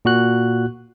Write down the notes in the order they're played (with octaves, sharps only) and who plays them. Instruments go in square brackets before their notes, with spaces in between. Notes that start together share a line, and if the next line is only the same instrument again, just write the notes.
[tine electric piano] A#2 F#4 F#6